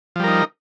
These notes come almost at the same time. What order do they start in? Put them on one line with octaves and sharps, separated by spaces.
F3 G3 A#4 D#4